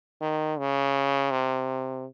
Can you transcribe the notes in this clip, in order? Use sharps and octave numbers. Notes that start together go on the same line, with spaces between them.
D#3
C#3
C3